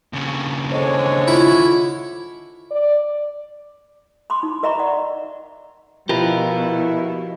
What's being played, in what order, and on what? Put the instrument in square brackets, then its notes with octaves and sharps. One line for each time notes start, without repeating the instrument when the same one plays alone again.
[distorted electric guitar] D#2 C#3
[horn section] D3 G#3 C#5 [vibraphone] C5
[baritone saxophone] E4 [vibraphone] F4
[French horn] D5
[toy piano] B5 C6 D6
D#4
A#4 D#5 E5 A#5 B5 C#6
D5 F#5 C#6
[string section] B2 [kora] F3 [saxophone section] E4 [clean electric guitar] G4 A#4 B4